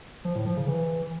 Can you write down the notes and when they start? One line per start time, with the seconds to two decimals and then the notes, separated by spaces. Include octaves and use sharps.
0.25 F3
0.35 A2
0.46 F3
0.57 C#3
0.68 E3